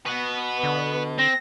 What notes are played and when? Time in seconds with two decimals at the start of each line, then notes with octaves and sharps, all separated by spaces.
0.06 B2 B4 F#5
0.63 D3
1.19 C4 A#6